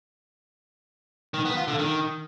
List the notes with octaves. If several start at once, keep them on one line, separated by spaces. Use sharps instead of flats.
D#3
B3
F4
D3
D#3